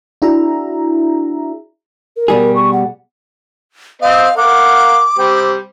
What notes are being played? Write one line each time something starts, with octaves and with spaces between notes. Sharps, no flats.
D4 E4 F#4 G#4 E5 A#5
A#4
B2 G3 G#4
C#6
F#5
C4 C5 D#5 F5
A#4 F5 F#5 D6
G3 C4 G4